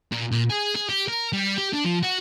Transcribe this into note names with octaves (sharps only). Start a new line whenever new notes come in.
A#2
A#2
G#4
G#4
G4
A#4
G3
G4
D4
F3
F#4